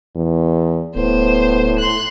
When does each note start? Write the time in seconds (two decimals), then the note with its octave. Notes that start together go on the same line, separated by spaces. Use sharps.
0.16 E2
0.96 D1 A2 B3 C5
1.79 C6 F#6